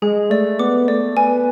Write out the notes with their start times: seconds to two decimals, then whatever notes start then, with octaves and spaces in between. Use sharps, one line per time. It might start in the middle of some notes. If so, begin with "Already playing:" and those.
0.02 G#3 G#4
0.30 A3 D5
0.59 B3 D6
0.88 A3 D5
1.16 B3 G#5